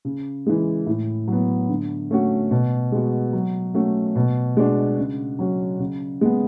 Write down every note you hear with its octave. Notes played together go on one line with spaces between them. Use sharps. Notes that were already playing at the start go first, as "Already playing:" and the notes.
C#3
E3 G#3
A2
F#3 B3
D3
A3 C#4 F#4
B2
G#3 B3 F#4
F#3
A3 C#4 F#4
B2
G#3 D4 F#4
C#3
F#3 C#4 F#4
C#3
G#3 B3